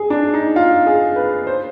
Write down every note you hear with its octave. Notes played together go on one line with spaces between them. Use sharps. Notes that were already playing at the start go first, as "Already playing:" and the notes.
Already playing: G#4
D4
D#4
F4
G#4
B4
C5